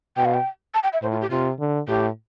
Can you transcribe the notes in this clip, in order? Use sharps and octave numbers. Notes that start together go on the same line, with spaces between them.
B2 G5
F5
G5
A5
G5
E5
A2 C5
F4
G4
C3 F4
D3
A2 G4